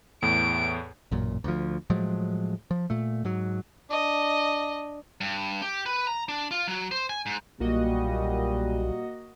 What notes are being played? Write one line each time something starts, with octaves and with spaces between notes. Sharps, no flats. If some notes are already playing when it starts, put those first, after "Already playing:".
E2 A2 D7
A1 F#2 A#2
D2 F3
A2 F3 F#3 G#3
F3
A#2 A3
G#2 F#3
D4 D#5
G2
G4
B4
A#5
D4
F4
F#3
C5
G#5
G#2
B1 A#2 G3 A#3 F#4 D#5